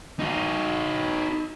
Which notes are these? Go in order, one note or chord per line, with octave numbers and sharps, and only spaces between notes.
D#4 F#4